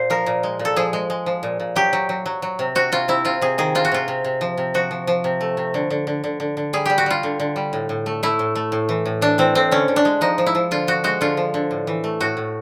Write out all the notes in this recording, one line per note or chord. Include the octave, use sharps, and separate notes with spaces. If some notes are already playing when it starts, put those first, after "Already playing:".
Already playing: A#2 C5
F3 A#4
A#2
G#3
A#2
A4
F3 G#4
G#3
G#3
F3
A#2
A#2
F#3 G4
F#3
F#3
F#3
F#3
C3
C3 F#4
C3 F4
C3 E4
C3 F4
C3 G#4
D#3 G#4
C3 F4
F#4
C3 F4
C3
C3
F3
C3
F3 F#4
F3
F3
C3
A3
C3
D3
D3
D3
D3
D3
D3
G3 G#4
G3 G4
F#4
G3 F4
D3
D3
G3
A2
A2
A3
A3 E4
A2
A3
A2
E3
A2
E3 D4
E3 C4
A2 C4
D3 C#4
D3
D4
G#3
F3 D#4
F3
E4
F3
D3 F4
F3 F#4
G#3 F#4
D3 F4
F3
D3
A2
E3
A3
A2 F#4
A2